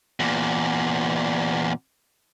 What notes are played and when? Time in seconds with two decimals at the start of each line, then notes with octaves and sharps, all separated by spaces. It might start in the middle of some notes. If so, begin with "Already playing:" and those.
0.20 E2 A#2